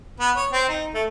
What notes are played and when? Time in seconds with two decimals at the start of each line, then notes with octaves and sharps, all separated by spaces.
0.20 B3
0.36 C#5
0.52 C4
0.69 D#4
0.94 A3